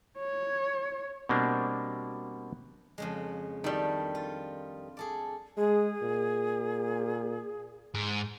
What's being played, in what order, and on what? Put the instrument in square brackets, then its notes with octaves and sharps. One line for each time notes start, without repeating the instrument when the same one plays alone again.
[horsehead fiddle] C#5
[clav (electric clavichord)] B2 G3 A#3 C4 D4
[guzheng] F2 C#3 G#3
[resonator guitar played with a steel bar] D#3 G3 [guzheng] A3 D4 A5
[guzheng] F4
G#4 A4 D5
[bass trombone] G#3 [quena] G#4
[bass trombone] A#2
[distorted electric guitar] G#2